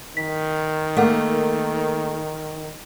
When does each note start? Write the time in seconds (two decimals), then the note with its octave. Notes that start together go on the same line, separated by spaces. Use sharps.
0.17 D#3 B6
0.97 A3 A#3 A4 F#5